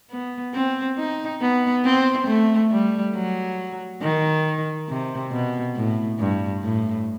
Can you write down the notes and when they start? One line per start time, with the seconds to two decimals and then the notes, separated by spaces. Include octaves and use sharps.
0.11 B3
0.54 C4
0.97 D#4
1.41 B3
1.85 C4
2.27 A3
2.71 G3
3.15 F#3
4.02 D#3
4.89 C3
5.32 B2
5.75 A2
6.19 G2
6.63 A2